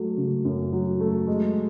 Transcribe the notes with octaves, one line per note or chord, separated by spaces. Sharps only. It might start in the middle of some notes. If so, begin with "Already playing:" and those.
Already playing: F#3 A3
C#3
F#2
F#3
A3
G#3